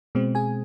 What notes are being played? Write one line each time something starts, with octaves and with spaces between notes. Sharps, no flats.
B2 G#3 C4
G#4 G#5